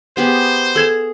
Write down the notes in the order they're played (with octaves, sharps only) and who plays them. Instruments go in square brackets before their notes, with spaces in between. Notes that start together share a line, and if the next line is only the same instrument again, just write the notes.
[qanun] B3 G4 G#4 [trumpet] C5
[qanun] G#4 [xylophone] A4 G#6 E7